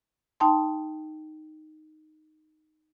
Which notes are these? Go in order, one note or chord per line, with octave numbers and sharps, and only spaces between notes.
D#4 G5 A5 C6